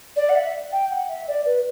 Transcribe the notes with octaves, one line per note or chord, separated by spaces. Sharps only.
D5
F#5
E5
G5
F#5
E5
D5
B4